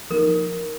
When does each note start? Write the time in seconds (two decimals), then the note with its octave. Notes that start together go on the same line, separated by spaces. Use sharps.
0.10 F3 A#3 D#4 A#4